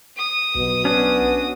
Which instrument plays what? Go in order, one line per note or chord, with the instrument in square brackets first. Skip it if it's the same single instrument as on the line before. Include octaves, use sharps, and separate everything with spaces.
[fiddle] D#6
[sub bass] B1 [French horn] B2
[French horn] B3 [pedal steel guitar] C#4 D4 F#4